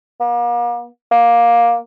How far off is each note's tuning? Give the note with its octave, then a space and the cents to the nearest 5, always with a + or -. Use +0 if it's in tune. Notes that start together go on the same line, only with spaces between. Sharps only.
A#3 +40
A#3 +15